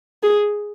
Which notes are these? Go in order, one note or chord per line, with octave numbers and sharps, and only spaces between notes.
G#4